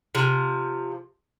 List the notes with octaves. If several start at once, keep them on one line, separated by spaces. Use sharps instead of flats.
C3 F3